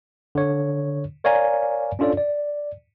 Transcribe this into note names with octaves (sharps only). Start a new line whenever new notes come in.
D3 C#5
A#4 C#5 D5 F5 G#5 A#5
C#4 D4 F4 A4 C#5 D5
D5